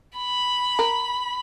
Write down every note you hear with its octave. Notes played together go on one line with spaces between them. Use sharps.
B5
A#4